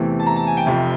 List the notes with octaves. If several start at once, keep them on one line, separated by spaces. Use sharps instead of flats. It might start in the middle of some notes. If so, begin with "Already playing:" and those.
Already playing: E2 C3 E3 A3
A5
A#5
A5
G#5
G5
F1 F2 C3 F3